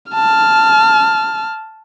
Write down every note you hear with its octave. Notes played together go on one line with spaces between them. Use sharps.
A5 F6